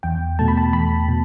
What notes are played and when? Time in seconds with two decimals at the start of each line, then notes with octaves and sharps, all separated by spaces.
0.03 E2 G5
0.39 B2 A3 A5
0.48 B5
0.57 A5
0.73 E2 B5
1.08 B2